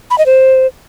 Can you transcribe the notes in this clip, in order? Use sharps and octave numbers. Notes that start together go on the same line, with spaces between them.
B5
D#5
C5